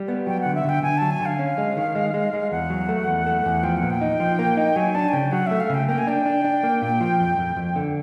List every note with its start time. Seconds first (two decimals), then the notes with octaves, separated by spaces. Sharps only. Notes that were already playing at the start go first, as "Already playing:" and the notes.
Already playing: G3
0.08 B3
0.27 F#3 G5
0.41 D3 F#5
0.55 E5
0.65 D3 G5
0.83 D3 G#5
0.98 F#3 A5
1.11 G#5
1.20 D3
1.26 F5
1.39 C#4
1.58 G#3
1.77 D#3
1.95 G#3
2.14 G#3
2.33 G#3
2.51 E2 F#5
2.70 F#3
2.89 A3
3.08 E2
3.26 A3
3.45 E2
3.63 F3 G5
3.77 F#5
3.82 A#2
3.90 G5
4.01 D#4
4.20 F3
4.39 A#3
4.57 D#4
4.76 F#3 G#5
4.95 D4 A5
5.08 G#5
5.13 C#3 G5
5.32 F#3 F#5
5.47 A3 E5
5.60 F5
5.70 C#3 G5
5.88 A#3 G5
5.98 G#5
6.07 D4 G5
6.26 D4
6.44 D4
6.63 A#3
6.82 A#2
7.00 F3
7.19 F2
7.38 F2
7.57 F2
7.76 D3